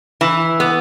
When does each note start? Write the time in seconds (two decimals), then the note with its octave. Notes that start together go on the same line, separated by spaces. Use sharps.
0.21 E3
0.60 B3